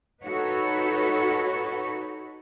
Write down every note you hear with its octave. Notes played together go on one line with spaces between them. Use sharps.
D#4 F#4 A4 B4 C#5